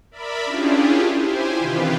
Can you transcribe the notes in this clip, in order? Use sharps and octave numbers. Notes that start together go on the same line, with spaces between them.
A#4 D5 E5 B5
C#4 D4 E4 F4 G4 G#4
E4 G4 C5 G#5
C3 D#3 E3 F4 G4 B4